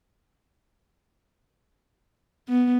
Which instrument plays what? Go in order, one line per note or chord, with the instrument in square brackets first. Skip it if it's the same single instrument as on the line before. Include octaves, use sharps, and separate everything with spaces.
[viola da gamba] B3